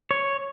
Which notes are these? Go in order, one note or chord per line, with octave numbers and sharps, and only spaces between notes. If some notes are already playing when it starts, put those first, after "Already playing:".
C#5